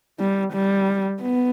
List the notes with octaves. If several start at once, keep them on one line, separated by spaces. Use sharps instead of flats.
G3
G3
B3